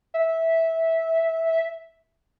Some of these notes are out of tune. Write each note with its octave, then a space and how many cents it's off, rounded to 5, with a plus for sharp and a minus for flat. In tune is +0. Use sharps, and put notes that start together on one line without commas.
E5 -10